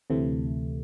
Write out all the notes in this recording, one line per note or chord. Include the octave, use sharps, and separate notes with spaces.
D2 C3 E3 A3